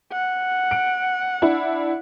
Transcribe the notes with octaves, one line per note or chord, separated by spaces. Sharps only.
F#5
D7
D4 E4